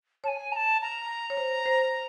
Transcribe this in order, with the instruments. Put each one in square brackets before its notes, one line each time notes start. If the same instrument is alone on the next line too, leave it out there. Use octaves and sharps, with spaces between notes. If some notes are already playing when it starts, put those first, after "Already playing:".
[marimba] C#5 [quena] G#5 A5
[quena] A#5
A5
A#5
[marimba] C#5
C5
C5